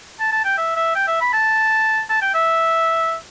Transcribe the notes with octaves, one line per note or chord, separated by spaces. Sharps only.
A5
A5
G5
E5
E5
G5
E5
B5
A5
A5
G5
E5